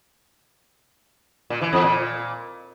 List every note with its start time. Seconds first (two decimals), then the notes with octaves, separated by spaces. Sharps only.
1.50 A#2
1.61 E3
1.73 E2
1.84 A#2